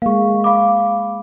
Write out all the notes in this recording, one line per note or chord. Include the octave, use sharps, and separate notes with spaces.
G#3 A#3 F5 C#6
F5 B5 D6